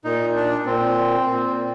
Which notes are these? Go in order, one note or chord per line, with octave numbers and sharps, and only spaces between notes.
A#2 D#4
D4
A#2 C4
A#2